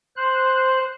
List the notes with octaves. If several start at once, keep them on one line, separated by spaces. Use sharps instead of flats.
C5 F#6